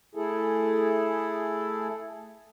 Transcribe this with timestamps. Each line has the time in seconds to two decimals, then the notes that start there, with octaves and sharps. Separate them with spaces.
0.15 A3 E4 G#4 A4